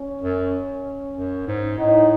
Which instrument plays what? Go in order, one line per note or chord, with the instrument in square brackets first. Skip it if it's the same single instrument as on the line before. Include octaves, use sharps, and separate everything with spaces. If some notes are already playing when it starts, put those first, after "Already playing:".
Already playing: [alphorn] C#4
[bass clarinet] F#2
F#2
G#2
[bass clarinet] A2 [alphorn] D#4